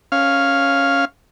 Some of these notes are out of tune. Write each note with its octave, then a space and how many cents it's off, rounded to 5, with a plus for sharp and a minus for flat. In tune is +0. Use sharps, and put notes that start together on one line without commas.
C#4 -5 F5 +0